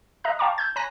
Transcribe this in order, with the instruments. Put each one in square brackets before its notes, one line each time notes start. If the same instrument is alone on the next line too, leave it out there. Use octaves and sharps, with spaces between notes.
[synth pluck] D#5 E5 A#5 F#6
F5 G5 A5 A#5 C#6 D6
E6 G6 G#6
C#5 G#5 A#5 B5 F#6 A#6